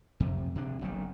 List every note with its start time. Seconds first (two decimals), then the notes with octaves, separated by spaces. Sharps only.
0.20 F2 C3
0.56 C3 D4
0.81 F#1 B1 C3 D#3